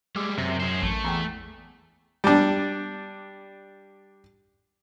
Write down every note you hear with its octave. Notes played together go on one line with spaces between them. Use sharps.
G3 G#3 D6 E6 F6
F#2 C3
G#4 C5
A1 A3
E2 G5 G#5 A#5
G3 D4